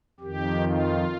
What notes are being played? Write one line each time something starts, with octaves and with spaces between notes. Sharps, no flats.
F2 D#3 G4
F4